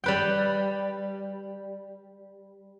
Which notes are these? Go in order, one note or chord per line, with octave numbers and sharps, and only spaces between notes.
G3 B4 G5